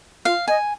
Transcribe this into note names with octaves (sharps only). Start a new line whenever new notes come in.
F4 F5
D#5 G#5